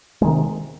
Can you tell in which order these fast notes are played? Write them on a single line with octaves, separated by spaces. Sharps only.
G#3 D#3 C3